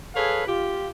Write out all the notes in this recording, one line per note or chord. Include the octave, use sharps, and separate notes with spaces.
G#4 A4 B4 C#5 F5
F4 G4